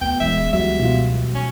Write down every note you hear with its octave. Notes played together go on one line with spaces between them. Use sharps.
D2 B3 G5
D#1 E3 G#3 C#4 E5
C#2 F#3 G3 F#4 E5
B2 F4
C#4